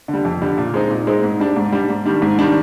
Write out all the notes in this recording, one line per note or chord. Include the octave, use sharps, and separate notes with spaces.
D3
G3
F2
D3 G3
A#2
G#3 C4 D#4
A#2
G#3 C4 D#4
G#2
G3 D4
G#2
G3 D4
G#2
D#3 G3 D4
G#2
D#3 G3 D4